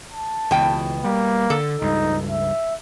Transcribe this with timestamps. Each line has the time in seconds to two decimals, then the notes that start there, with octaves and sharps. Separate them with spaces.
0.12 A5
0.51 C#2 B2 E3 G5
1.04 G3 A#3
1.50 D3 A4
1.81 C#2 G2 D#4
2.30 E5